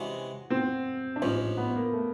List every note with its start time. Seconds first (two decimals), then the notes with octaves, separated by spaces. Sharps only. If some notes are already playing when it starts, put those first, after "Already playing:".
Already playing: C3 E3 G#3 C#4 F#4
0.50 C4
1.16 D4
1.22 A1 G#2 F3 C#4
1.57 B3
1.76 A#3
1.93 A3